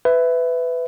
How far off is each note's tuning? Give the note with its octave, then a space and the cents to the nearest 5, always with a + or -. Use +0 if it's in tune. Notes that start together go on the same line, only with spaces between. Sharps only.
B4 +20 E5 +0